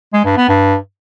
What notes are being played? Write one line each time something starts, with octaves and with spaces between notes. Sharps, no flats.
G#3
G2
B3
G2